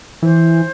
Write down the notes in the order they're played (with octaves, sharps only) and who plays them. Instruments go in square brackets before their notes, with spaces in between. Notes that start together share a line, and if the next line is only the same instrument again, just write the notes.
[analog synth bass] E3 [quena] C5